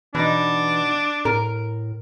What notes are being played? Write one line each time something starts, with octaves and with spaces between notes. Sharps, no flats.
B2 E3 D4 D#4
A2 A#4